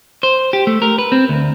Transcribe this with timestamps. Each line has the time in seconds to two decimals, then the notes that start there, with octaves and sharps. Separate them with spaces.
0.23 C5
0.53 G4
0.67 A3
0.82 A#4
0.98 B4
1.12 C4
1.29 D2